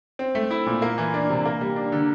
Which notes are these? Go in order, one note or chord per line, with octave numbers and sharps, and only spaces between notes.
C4
A3
E4
A#2
A#3
E3
D4
C3
A#3
G3
D4
D3